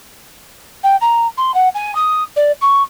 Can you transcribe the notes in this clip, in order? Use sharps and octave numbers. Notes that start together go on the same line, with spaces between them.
G5
A#5
C6
F#5
G#5
D#6
D5
C#6